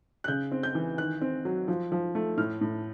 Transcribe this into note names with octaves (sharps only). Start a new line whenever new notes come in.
F#6
C#3 G6
C4
G6
E3
D#3 F#6
C4
F#3
F3
F3
A3
A2 F6
A2